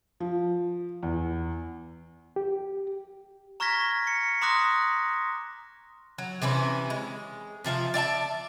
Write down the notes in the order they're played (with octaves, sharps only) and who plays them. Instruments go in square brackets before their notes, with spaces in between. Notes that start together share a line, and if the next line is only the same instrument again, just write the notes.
[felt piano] F3
E2
[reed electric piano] G4
[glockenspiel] A#5 C#6 F6 G#6 A#6 B6
C#7
A#5 C6 D6 D#6 F#6 A#6
[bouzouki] F#3
C3 E3 C#4 E4
G#3
C3 F3 E5 F5
D5 E5 F5 A5